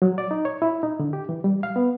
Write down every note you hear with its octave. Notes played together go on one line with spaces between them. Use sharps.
F#3
D5
D#4
C#5
E4
D#4
D3
G4
E3
G3
F5
B3